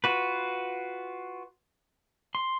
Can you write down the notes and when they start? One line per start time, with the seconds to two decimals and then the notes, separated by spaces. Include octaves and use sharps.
0.04 F4 F#4 B4
2.35 C6